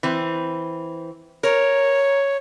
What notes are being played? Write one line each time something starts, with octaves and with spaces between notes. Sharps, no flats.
E3 C4
A#4 C#5